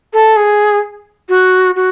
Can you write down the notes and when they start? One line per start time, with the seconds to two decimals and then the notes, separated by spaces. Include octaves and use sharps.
0.13 A4
0.36 G#4
1.29 F#4
1.76 F#4